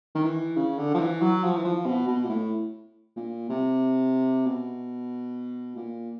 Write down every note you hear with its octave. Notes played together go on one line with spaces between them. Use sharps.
D#3
E3
C#3
D3
F3
E3
F#3
F3
E3
F3
B2
B2
A#2
A2
A#2
C3
B2
A#2